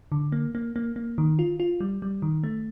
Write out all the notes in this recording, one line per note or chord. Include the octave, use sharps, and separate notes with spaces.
D3
A#3
A#3
A#3
A#3
D#3
F4
F4
G3
G3
D#3
A3